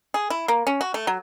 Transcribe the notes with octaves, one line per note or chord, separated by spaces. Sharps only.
G#4
E4
A#3
C#4
F#4
A3
F#3